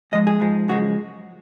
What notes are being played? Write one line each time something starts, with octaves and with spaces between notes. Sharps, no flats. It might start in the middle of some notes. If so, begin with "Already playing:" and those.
G#2 F3 G#3 D#5
G#4
G#2 F3 G#3
F#2 C#3 F3 G#3 F#4